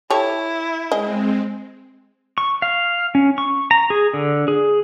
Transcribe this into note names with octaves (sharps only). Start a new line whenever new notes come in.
E4 G4 A4 C#5
G#3 C4 G#4 D#5
C#6
F5
C#4
C#6
A#5
G#4
D3
G#4